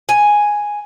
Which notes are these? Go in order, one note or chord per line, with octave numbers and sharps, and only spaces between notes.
G#5